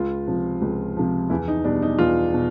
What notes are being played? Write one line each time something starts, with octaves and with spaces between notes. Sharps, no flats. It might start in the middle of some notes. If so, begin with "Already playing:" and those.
Already playing: C#2 F4
C3 F3
C#2
C3 F3
E2 E4
D#4
B2 G3 D4
D#4
E2 F4
B2